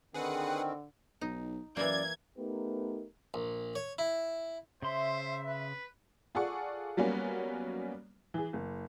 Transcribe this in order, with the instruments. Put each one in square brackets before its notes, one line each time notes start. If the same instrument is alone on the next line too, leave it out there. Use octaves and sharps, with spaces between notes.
[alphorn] D3 [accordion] D#3 C4 [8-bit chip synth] G#4 B4 F#5
[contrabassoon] B1 [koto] D#4
[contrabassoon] F#2 [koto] E3 A#3 [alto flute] D5 [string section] G#6
[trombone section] A3 B3 D#4 G4 A#4 B4
[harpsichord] A#1
C#5
E4
[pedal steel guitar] C#3 C6 [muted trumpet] C5 [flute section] E5
[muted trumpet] B4
[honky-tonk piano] F4 G#4 A4 D5 F#5 C#6
F#3 G3 A#3 B3 C#4 F#4
E3 G#4
F#1